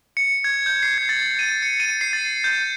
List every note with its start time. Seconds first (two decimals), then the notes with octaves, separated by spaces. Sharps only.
0.17 C#7
0.44 G#6
0.66 G6
0.83 C7
0.98 G#6
1.09 A6
1.39 D#7
1.62 C#7
1.80 D#7
2.01 C7
2.13 A6
2.44 G6